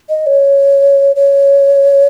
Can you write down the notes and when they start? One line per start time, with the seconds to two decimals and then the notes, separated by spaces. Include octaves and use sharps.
0.09 D#5
0.26 C#5
1.16 C#5